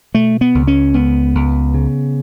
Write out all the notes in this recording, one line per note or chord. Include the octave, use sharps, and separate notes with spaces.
B2 A3
B3
C#2
C#4
C#2 B3
C#2
C#3